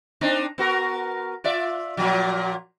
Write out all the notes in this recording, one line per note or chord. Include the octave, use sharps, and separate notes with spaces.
C4 D4 D#4
B3 F#4 A#4
F4 D5 E5
A#2 F3 F#3